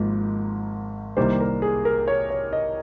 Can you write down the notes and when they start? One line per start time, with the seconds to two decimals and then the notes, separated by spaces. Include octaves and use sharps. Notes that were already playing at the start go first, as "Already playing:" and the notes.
Already playing: G#1 G#2 F3 A#3
1.17 C2 C3 D#3 G3 A#3 C5
1.40 A#4
1.62 G#4
1.85 A#4
2.08 C#5
2.30 C#5
2.53 D#5